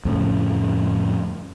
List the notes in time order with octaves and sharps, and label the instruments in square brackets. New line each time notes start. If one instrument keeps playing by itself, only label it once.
[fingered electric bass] F2 A2 C#3